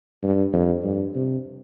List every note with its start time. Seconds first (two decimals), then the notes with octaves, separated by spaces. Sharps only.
0.23 G2
0.53 F2
0.84 G2
1.15 C3